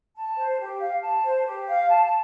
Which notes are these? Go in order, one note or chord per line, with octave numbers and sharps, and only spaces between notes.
A5
C5
G4
F5
A5
C5
G4
F5
A5